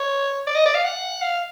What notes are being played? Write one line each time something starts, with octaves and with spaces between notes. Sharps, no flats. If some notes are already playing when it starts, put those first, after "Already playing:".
Already playing: C#5
D5
D#5
D5
F5
F#5
F5